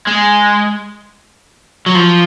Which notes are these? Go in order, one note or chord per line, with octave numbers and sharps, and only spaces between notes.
G#3
F#3
F3